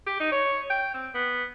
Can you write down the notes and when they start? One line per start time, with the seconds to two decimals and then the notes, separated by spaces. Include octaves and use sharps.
0.07 G4
0.20 D#4
0.32 C#5
0.70 G5
0.94 C4
1.14 B3